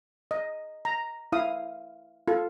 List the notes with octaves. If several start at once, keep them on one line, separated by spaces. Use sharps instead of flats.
D#5
A#5
E4 F5 D#6
F4 A4